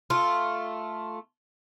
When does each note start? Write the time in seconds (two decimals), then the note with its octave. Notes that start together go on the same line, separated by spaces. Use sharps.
0.10 A3 F4